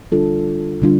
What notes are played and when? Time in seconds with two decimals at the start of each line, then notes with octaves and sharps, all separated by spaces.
0.12 D3 G3 D4 F4 A4
0.82 D3 G3 D4 F4